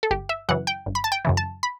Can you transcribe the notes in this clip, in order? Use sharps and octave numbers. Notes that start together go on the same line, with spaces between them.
A4
G1 G4
E5
F#2 C#3 E3 F#5
G5
G1
B5
A5
G5
F#2 C#3 E3
A5
B5